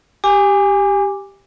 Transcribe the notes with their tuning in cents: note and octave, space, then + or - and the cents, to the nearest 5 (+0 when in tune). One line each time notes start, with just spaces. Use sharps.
G4 +0 G#5 -25 D6 +0